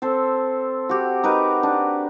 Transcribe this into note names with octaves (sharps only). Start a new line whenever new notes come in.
C4 A4 C5
F#4 G4
D#4 A#4 B4
D4